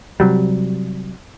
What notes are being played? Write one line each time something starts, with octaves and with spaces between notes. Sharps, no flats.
C3 F#3 G3